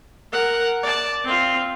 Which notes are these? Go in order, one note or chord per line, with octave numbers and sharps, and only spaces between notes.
A#4 F#5
D5 A5
C4 F4